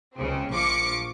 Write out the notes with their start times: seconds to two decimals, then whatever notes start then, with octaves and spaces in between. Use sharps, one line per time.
0.16 C#2 C#3 C4
0.52 A#1 F3 C#6 D6 C#7